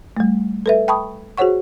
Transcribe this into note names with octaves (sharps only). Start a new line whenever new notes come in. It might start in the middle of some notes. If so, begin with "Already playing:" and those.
G3 A3
A4 B4 E5
G5 A5 B5 C#6 D#6
F#4 G#4 C5 C#5 F#5 C#6